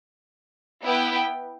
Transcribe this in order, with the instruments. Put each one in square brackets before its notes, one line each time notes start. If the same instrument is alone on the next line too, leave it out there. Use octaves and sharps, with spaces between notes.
[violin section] B3 E4 B4 G5